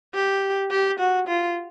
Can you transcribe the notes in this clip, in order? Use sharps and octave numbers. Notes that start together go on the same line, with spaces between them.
G4
G4
F#4
F4